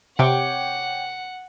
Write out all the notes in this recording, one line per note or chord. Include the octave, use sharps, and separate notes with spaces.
C3 C#5 F#5 G5 D6